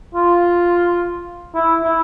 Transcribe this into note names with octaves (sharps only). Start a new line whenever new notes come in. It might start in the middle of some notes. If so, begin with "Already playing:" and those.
F4
E4
E4